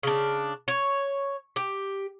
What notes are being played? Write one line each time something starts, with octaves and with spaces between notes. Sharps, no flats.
C#3 D4
C#5
G4